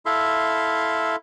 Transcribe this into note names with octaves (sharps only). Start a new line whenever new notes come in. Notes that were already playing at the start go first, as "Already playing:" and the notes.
E4 A4 E5 F5 C6